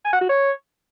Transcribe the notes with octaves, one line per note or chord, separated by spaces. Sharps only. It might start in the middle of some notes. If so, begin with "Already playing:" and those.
G#5
F#5
F#4
C#5